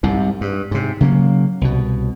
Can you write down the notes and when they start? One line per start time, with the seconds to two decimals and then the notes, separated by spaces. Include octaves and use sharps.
0.03 C2 G#2 C3
0.41 G2
0.71 G#2 C3
1.01 C#3 F#3 A#3
1.61 C2 B2